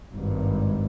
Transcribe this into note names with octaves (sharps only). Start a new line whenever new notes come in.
G#1 G2